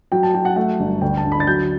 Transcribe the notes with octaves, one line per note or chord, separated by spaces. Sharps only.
F#3 G5
A5
F#3 G5
F#5
A3 F#5
G1
D2 G5
A5
D2
B5
A6
F#3 G6